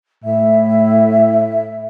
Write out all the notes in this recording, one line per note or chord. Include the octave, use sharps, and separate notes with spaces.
A2 E5